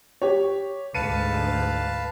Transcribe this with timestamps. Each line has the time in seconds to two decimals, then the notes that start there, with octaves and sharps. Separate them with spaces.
0.22 G4 C#5
0.94 D2 G#2 B4 F5 A5 C#7 D#7